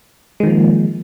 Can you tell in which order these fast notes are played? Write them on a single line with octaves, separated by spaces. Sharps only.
G#3 D#3 F3 A#3